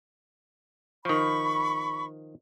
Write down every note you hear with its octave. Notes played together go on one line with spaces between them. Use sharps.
D#3 F3 B5 C#6